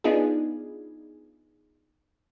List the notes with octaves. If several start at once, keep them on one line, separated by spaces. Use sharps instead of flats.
B3 D4 D#4 F4 G#4